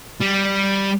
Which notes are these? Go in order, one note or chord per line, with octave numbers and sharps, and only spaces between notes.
G3